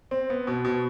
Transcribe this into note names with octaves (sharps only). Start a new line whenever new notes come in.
C4
B3
B2
B2